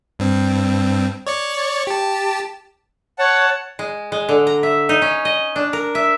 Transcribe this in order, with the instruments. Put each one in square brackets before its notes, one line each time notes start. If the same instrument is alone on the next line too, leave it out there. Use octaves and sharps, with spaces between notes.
[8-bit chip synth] G2 C4
C#5 D5 C#7
G4 A5
[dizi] C#5 [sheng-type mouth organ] F#5 A5
[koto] G#3
G#3
D3
A#5
E5
D#4
C#4
D#5
D4
A#4
E5